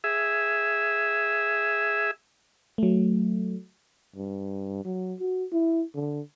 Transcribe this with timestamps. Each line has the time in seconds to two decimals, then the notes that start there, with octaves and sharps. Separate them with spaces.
0.04 G#4 E5
2.78 F#3 A3
4.16 G2
4.85 F#3
5.20 F#4
5.52 E4
5.95 D3